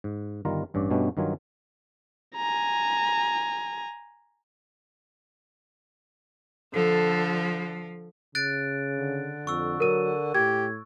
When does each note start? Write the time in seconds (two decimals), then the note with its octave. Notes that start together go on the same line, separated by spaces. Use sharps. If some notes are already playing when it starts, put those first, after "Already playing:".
0.04 G#2
0.45 G1 D#3 G3 F4 A#5
0.74 A1 G2 C#4 D5
0.90 G2 B2 G3 A3 C#4
1.17 G2 D#3 F#3 F4 G#5
2.36 G#5 A#5
6.74 D3 F3 A4
8.35 C#3 F#6 A6 D7
8.97 D3
9.47 F2 C#6 E6
9.80 F#3 A#4 D#7
10.34 A2 G4 G#6